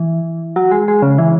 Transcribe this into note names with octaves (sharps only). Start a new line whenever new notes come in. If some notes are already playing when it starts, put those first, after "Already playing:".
Already playing: E3
F#3
G#3
G#3
C#3
E3